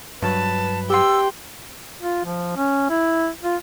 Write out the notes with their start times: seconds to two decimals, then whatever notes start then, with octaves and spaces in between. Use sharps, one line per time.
0.22 G2 F#3 B4 A5
0.90 G4 G5 C6 E6
2.00 F4
2.25 F3
2.57 C#4
2.90 E4
3.43 F4